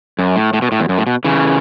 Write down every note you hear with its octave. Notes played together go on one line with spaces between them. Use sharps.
F#2
A2
A2
B2
A2
E2
F#2
A2
B2
C#3 E3